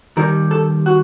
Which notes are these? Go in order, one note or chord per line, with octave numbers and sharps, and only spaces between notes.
D#2 D#3 G3 A#4
A4
F#4